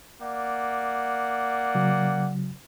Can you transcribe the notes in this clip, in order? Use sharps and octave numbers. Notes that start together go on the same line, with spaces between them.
A#3 D5 F#5
C#3 F#3